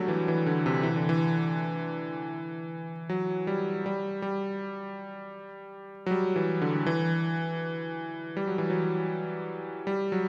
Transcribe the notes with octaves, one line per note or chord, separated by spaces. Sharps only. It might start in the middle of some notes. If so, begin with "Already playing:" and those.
Already playing: D3 F#3 G3 A3
E3
E3
D3
C3
E3
D3
E3
F#3
G3
G3
G3
F#3
G3
E3
D3
E3
G3
F#3
E3
F#3
G3
F#3